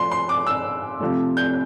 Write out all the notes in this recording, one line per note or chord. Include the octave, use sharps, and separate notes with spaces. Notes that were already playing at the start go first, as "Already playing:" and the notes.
Already playing: F3 A3 C6
C6
D6
E6
C3 F3 A3
G6